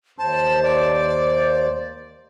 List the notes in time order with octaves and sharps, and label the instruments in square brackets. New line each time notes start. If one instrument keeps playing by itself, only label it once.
[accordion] D#2 C5 [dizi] A5
[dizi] D5